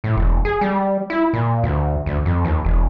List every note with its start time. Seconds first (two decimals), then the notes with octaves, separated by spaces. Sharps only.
0.04 A2
0.17 E1
0.45 G#4
0.61 G3
1.10 E4
1.33 A#2
1.63 D2
2.06 D2
2.25 F2
2.45 D#2
2.65 E1